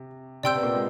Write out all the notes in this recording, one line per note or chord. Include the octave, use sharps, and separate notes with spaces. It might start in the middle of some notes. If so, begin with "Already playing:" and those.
Already playing: C3
C3 C4 D5 G5 C6 E6 G6
B3
A#2 A#3
G#3